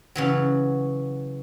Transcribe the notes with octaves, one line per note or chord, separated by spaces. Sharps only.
C#3 E3 F#3